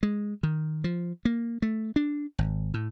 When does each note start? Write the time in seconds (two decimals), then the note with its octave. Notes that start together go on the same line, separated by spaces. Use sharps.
0.03 G#3
0.43 D#3
0.84 F3
1.25 A#3
1.62 A3
1.96 D4
2.39 G#1
2.74 A2